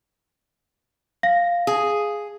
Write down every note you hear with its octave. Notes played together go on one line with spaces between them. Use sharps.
F5 A#6
G#4